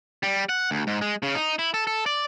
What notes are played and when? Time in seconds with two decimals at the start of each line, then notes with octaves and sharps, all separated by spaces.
0.23 G3
0.49 F#5
0.71 D2
0.87 G#2
1.01 G#3
1.23 C#3
1.35 D#4
1.59 E4
1.74 A4
1.87 A4
2.06 D5